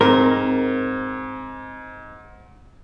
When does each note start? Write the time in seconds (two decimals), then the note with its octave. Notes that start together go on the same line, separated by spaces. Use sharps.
0.01 G#2 C4 A#4